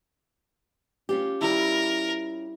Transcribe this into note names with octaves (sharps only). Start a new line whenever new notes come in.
C#4 F4 G4
G3 E4 A#4